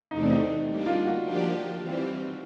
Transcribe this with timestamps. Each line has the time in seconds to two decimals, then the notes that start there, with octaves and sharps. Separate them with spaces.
0.11 E2 C3 E3 A3 C4 D#4
0.22 D4
0.31 D#4
0.68 G3 A#3 D4
0.86 F4
1.05 F#4
1.24 F3 A#3 D4 G4
1.80 E3 G3 C4